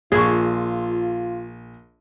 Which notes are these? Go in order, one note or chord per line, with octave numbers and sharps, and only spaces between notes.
A#1 F4 G#4 C#6